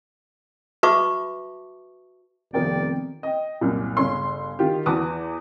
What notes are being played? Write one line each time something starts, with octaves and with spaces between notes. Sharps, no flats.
F#4 B4 E5 A5 C#6 D6
F1 D#3 F3 B3 C4 A#4 D5 G5
D#5 G5
C2 F#2 A#2
G1 C#3 C#4 C6 E6
D#3 F4 G4
E2 F#4 B4 A5 D6 D#6